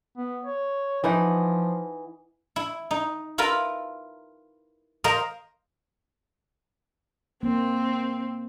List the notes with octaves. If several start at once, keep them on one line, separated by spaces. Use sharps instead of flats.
B3
C#5
E3 F3 D#4 F#5
E4
D#4
E4 F4 A#4 B4
A#4 C5 D#5 F5
A#3 C4